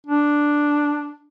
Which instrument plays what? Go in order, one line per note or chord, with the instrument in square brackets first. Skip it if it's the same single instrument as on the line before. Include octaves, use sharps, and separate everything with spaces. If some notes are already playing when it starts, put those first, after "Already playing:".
[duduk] D4